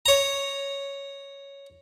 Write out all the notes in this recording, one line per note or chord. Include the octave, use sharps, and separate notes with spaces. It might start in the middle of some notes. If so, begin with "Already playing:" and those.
C#5 A#5